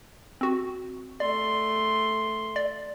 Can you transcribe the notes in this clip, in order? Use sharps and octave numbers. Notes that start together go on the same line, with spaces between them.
C4 F#4
A3 D5 C6
D5